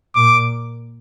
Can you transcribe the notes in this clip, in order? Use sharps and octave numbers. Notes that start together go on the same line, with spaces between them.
A#2 D6